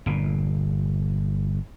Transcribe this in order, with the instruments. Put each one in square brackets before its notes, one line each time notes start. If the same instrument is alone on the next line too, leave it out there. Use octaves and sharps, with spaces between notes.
[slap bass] G1 A#2